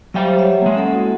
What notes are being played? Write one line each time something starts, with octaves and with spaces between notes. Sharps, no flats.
F#3 G3 C5 E5 F5 G5
C#5 E5 F#5
G#3 A#3
C#4 A4 F#5
E4 F#4 A4